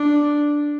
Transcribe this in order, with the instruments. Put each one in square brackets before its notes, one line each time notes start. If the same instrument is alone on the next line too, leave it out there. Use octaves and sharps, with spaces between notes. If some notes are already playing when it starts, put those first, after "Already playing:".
Already playing: [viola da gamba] D4